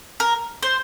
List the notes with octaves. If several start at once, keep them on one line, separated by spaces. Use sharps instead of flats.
A#4
C5